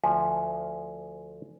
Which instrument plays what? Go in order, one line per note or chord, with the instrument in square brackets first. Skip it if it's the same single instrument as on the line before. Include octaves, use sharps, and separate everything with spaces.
[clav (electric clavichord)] D2 F3 [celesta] G#5